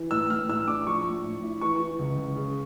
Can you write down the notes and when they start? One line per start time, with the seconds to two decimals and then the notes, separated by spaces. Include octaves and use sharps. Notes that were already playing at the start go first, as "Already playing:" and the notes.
Already playing: E3
0.11 A2 E6
0.30 A2 F6
0.49 A2 E6
0.67 D4 D6
0.86 F3 C#6
1.05 A2
1.24 A2
1.43 E4
1.61 E3 C#6
1.80 E3
1.99 C#2
2.17 C#2
2.36 C#3